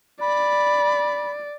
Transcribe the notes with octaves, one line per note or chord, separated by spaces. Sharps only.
D5 B5